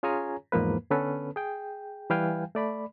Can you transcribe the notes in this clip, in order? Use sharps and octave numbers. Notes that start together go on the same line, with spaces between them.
C#4 F4 G#4 C#5 G#5 A#5
E2 G#2 F3 A#3 B4
D3 B3 C#4 A4 B4
G#4 G5
E3 G3 B4 F5 G5 G#5
A3 D5 B5